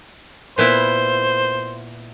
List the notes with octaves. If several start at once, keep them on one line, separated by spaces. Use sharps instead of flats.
A#2 B3 E4 C5